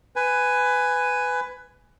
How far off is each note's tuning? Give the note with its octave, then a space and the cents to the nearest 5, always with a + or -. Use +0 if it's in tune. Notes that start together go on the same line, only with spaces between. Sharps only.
B4 +15 G#5 +0